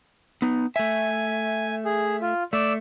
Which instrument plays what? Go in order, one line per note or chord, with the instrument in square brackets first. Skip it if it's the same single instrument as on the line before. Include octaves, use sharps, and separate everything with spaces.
[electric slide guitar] B3 D#4
[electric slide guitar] A3 E5 [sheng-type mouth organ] G#5
[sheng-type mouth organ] G#4
F4
[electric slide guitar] A3 [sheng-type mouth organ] D5 E6